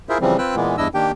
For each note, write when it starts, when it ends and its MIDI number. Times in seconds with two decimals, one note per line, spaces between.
0.09 0.18 64
0.09 0.18 65
0.09 0.18 68
0.09 0.18 70
0.09 0.18 72
0.09 0.18 76
0.21 0.37 49
0.21 0.37 52
0.21 0.37 53
0.21 0.37 55
0.21 0.37 60
0.38 0.55 60
0.38 0.55 65
0.38 0.55 71
0.38 0.55 79
0.38 0.55 88
0.38 0.55 90
0.55 0.76 46
0.55 0.76 52
0.55 0.76 56
0.55 0.76 58
0.55 0.76 59
0.78 0.88 40
0.78 0.88 43
0.78 0.88 62
0.78 0.88 64
0.78 0.88 75
0.78 0.88 88
0.94 1.11 51
0.94 1.11 58
0.94 1.11 62
0.94 1.11 67
0.94 1.11 79